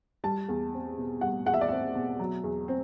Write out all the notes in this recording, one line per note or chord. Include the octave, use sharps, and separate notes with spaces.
G3 A5
E2
C4
B2
G3 F#5
E2 F#5
E5
D5
C4 E5
B2
F#3
E2
C4